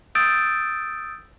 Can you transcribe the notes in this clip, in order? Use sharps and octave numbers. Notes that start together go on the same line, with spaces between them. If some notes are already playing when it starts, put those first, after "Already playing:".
D#6 E6 G6 A6 D7